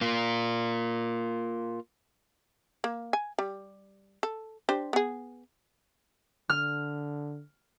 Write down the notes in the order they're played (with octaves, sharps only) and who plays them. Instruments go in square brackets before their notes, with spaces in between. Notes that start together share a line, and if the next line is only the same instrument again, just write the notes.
[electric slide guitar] A#3 F4
[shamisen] A#3
G#5
G3
A4
D4 G4 C5
B3 G#4
[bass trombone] D3 [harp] F6